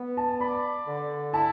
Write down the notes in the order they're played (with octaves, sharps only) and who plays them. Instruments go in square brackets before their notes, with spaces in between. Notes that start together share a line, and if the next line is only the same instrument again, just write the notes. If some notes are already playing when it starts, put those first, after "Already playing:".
Already playing: [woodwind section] B3
[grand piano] A5
[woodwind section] D5 [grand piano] B5
[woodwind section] D3
[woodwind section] E4 [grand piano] A5